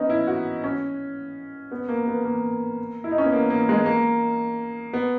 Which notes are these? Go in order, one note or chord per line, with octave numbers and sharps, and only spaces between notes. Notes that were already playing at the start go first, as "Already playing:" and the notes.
Already playing: B3 C#4 D#4
E4
F#4
C#4
B3
A#3
B3
A#3
E4
D#4
C#4
B3
A#3
A#3
G#3
A#3
B3